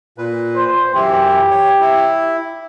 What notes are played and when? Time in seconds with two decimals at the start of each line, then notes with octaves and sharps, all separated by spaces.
0.18 A#2 B4
0.56 C5
0.95 F#2 E3 E4 G4
1.51 C#5
1.80 E4